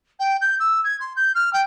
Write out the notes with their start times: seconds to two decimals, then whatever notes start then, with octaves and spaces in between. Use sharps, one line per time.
0.19 G5
0.41 G6
0.59 E6
0.84 G#6
1.00 C6
1.16 G6
1.34 F6
1.53 G5